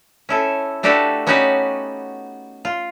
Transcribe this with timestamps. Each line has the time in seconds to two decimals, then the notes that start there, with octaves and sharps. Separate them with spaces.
0.29 C#4 E4 A4
0.83 A3 D4 F#4 G4 A4 B4
1.27 B3 C#4 D#4 F#4 G4 B4
2.65 F4